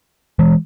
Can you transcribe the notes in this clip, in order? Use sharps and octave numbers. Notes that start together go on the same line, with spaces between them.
E3 G#3